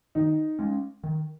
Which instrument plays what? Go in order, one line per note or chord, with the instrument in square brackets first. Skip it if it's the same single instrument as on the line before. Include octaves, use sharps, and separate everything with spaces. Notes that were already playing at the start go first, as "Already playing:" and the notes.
[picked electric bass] D#3 [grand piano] D#4
[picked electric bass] G#3 C#4
D#3